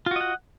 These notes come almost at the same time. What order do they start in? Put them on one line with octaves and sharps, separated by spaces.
F4 F#4 D#5 F#5